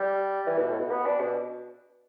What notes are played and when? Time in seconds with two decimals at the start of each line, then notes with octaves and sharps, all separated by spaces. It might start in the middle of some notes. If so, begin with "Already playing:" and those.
Already playing: G3
0.46 E3
0.58 B2
0.69 A2
0.79 B2
0.91 B3
1.06 D4
1.21 B2